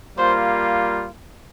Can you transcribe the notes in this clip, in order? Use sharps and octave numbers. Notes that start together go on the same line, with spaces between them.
G3 A#3 F4 C5